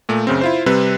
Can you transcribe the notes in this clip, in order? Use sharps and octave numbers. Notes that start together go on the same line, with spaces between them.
A#2 A3
F#2 C#3 C4
E4 F4 C5
C3 G3 C4 B4